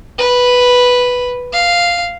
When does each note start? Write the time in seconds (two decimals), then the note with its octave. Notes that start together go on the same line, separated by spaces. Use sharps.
0.18 B4
1.53 F5